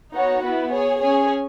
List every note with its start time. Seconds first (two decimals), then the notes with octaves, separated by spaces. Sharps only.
0.14 B3 D#4 F#4 C#5 F#5
0.42 B3 E4 B4
0.71 G#4 C#5 G#5
1.00 C#4 G#4 C#5 G#5